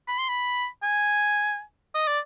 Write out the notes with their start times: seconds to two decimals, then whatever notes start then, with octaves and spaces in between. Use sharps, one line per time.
0.08 B5
0.18 C6
0.29 B5
0.83 G#5
1.95 D#5
2.08 D5